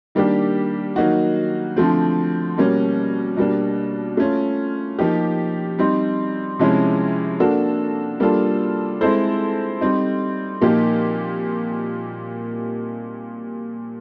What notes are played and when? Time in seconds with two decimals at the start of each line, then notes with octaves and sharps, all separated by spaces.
0.15 D#3 G3 A#3 D4 G4
0.96 D#3 F#3 A#3 D#4 F#4
1.77 D3 F3 A3 C4
2.58 B2 G3 A#3 C#4
3.37 B2 G3 A#3 D4
4.17 A3 C#4 F4
4.99 F3 A#3 D#4 G4
5.79 G3 C4 D#4
6.59 C3 F3 G#3 C#4 E4
7.40 A#3 D4 F#4 A4
8.20 G3 A#3 D4 F4 A4
9.01 G#3 C4 E4 A4 C5
9.81 G3 C4 D#4
10.62 A#2 F3 A#3 D#4 G4